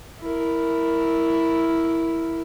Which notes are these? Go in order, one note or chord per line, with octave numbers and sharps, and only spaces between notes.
E4 A#4